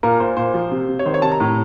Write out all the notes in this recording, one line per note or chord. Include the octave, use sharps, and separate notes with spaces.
A#2 A#4
A#2 C5
A#2 C5
F3
C3
C3
C#5
D#3 C5
C#5
C3 A5
A#5
A2